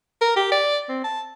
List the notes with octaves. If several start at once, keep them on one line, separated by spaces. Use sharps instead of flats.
A#4
G4
D5
C4
A5